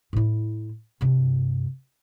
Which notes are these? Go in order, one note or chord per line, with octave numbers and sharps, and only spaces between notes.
A2 E4
G2 C3